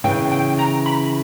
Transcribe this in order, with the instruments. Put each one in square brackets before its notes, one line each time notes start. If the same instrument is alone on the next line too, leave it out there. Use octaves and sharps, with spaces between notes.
[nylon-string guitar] C#3 E3 [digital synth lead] G5
[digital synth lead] G5
A#5
B5